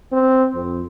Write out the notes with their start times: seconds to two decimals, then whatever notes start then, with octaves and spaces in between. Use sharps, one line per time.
0.13 C4
0.55 F2